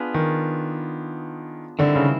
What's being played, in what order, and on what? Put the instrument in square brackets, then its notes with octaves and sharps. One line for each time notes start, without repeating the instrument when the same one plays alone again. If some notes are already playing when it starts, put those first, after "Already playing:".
Already playing: [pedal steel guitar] B3 D4 F4 G#4 B4
[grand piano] D#3
[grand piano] D3 [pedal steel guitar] D#3 G3 C4 E4
[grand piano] C#3